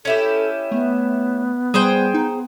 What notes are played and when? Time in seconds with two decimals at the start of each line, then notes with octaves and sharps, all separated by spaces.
0.05 C#4 E4 G4 A4
0.72 A3 B3
1.74 G3 G#4 C5 G5
2.14 D#4